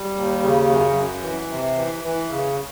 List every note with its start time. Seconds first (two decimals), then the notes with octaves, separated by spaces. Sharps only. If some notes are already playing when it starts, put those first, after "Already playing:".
Already playing: G3
0.15 D#2
0.42 C#3
0.69 F#2
0.96 F#2
1.23 E3
1.50 C3
1.77 E3
2.04 E3
2.30 C#3